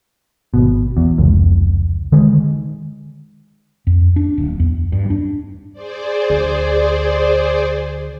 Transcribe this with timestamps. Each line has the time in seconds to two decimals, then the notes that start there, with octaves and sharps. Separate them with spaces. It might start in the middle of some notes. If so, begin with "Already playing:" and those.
0.54 G#1 B2
0.97 E2
1.18 F1 C#2
2.12 D3 D#3 G#3
3.87 F2
4.16 D4
4.38 D1
4.60 E2
4.92 G2
5.10 D4
5.73 G#4 C5 D5
6.30 D2